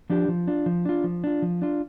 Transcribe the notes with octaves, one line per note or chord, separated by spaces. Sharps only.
F3 D4 G4
F3
D4 F4
F3
D4 F4
F3
D4 F4
F3
D4 F4